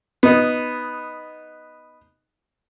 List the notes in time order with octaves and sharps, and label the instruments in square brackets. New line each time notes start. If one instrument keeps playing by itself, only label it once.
[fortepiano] B3 D#4